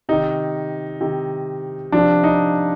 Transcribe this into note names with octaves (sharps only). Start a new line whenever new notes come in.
C3 D#3 D#4
C3 D#3
C3 F3 D4
D#4